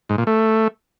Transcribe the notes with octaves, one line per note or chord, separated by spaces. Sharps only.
G#2
A#2
A3